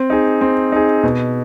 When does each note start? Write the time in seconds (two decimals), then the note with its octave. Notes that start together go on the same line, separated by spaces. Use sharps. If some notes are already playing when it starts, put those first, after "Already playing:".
Already playing: C4
0.10 D#4 G#4
0.41 C4
0.72 D#4 G#4
1.03 B2